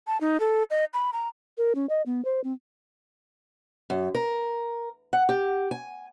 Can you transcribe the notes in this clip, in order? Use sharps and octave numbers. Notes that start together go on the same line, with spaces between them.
A5
D#4
A4
D#5
B5
A#5
A#4
C#4
D#5
B3
C5
C4
F#2
A#4
F#5
G4
G#5